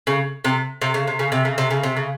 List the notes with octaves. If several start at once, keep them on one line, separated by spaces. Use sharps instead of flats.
C#3
C3
C3
C#3
C3
C#3
C3
C#3
C3
C#3
C3
C#3